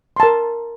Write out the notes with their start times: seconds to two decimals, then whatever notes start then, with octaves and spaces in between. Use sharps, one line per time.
0.16 C6
0.20 A5
0.23 A#4